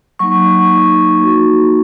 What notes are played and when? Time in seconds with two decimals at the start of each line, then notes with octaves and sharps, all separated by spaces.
0.19 F#3 A#3 D#4 C#6
0.70 F#3 A#3 D#4
1.20 A#3 D#4 F#4